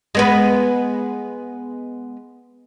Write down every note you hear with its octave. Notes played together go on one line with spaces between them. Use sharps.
G#3 B3 B4